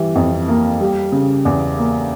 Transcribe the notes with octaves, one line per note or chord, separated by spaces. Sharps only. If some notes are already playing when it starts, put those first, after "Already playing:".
Already playing: E3 G3
F2
A#3
G3
C#3
E2
A#3